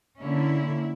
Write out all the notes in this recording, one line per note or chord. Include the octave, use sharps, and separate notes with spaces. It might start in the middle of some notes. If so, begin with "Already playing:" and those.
D3 A#3 C#4 E4